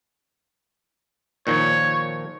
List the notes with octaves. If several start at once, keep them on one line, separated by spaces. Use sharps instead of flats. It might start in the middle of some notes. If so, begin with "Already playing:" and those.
A#2 D#3 F3 C#5